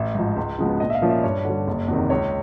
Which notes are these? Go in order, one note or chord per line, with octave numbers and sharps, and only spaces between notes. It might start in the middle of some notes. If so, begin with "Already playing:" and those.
Already playing: A1 E5
G#2 F3
C#2
C#3 F3 G#3 B3
A#1 D#5
E5
F5
A#2 F3 A#3 C#4
E5
G2 C#5
D3 G3
F#1
E2 C3 D#3
C#2 C#5